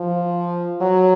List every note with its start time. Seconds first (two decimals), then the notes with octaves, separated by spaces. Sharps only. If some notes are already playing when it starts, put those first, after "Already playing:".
Already playing: F3
0.81 F#3